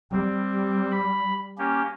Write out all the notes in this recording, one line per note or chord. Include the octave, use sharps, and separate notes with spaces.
G3 C4
B5
A#3 C#4 G4